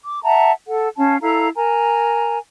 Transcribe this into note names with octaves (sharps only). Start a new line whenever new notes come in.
D6
E5 F#5 A5 A#5
A4 F#5
C#4 F5 A5
E4 A4 F5 A#5
A#4 G#5 A#5